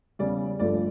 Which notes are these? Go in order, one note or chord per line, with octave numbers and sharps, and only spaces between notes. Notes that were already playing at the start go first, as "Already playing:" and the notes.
E2 C#3 G3 D5
G1 G2 F3 A3 D5